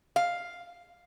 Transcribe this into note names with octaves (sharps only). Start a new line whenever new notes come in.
F5